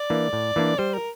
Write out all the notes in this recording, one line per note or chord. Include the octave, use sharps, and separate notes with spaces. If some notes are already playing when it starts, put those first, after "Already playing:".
Already playing: D5
E3 A#3 D4
A2
E3 A#3 D4
G3 C5
A#4